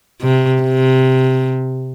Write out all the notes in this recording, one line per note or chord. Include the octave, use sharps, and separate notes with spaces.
C3
C3